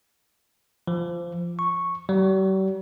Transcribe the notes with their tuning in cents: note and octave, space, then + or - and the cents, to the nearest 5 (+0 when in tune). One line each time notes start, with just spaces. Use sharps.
F3 -15
C#6 -5
G3 -45